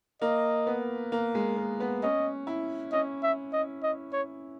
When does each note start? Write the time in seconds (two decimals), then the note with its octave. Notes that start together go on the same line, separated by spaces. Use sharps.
0.22 A#3 D#5
0.67 B3
1.12 A#3
1.35 G#3
1.57 A#3
1.80 B3
2.03 C#4 D#5
2.47 E4
2.92 C#4 D#5
3.23 E5
3.53 D#5
3.83 D#5
4.13 C#5